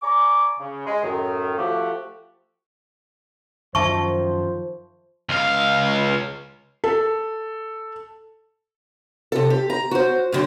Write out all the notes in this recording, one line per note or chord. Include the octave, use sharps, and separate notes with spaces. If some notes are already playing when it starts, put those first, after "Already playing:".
D5 G#5 A#5 C#6 D6
C#3
G#3
F#2 A2 D#3
F3 A3 F#4 G4
F#2 D#3 F3 C5 E5 A5 C#6
C#2 F5
A4
C3 A4
G4
A#5
F#4 C5
A2 D3 F#3 C4